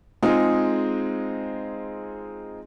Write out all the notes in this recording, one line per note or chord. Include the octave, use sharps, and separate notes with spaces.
G#3 C4 D#4 F4 G#4